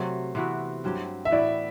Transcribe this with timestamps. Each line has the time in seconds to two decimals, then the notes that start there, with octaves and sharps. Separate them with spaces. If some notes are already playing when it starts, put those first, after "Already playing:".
Already playing: C3 F#3 A3 C4 C5
0.35 C3 E3 B3 F#4
0.84 G2 F#3 C4 G4
1.25 E5
1.31 A2 E3 B3 E4 D5